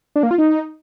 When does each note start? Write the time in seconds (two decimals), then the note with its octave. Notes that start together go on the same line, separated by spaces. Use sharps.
0.16 D4
0.23 A#3
0.31 F4
0.38 D#4